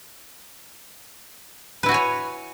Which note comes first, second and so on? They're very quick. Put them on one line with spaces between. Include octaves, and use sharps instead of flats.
B4 E4 F#4 G#5 C#5